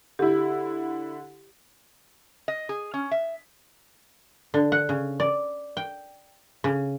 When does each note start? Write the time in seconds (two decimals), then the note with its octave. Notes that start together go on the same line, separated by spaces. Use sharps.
0.19 D3 E4 G4
2.48 D#5
2.69 G#4
2.94 C#4
3.11 E5
4.54 D3
4.72 F#5
4.89 C#3
5.20 D5
5.77 G5
6.64 C#3